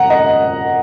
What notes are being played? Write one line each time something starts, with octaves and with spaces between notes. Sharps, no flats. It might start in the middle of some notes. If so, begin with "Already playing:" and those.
Already playing: F#5 A#5
D#5